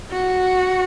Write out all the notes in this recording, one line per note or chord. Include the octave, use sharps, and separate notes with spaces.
F#4